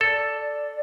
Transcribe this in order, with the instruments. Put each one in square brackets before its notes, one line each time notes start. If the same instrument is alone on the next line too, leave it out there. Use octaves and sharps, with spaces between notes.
[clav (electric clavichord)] A4 [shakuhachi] D5